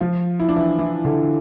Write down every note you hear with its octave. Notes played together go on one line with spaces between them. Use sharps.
F3 F4
E4
D4
E3 E4
E3 E4
D3 D4